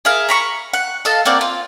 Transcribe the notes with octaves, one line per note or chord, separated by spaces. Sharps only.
G#4 A#4 E5 F5
A#5 B5 C#6
F#5
A4 D#5 F5 A5
A#3 C4 F#4 D5
F4